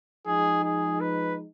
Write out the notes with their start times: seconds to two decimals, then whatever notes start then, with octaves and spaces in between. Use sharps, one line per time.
0.26 F3 G#3 D#4 G#4
0.63 G#4
1.00 B4